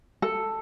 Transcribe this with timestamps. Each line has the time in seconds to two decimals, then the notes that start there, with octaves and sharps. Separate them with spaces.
0.22 A4